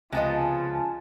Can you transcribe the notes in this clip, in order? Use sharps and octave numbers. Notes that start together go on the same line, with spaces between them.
C#2 C3 F3 B3 D#5 G#5 A5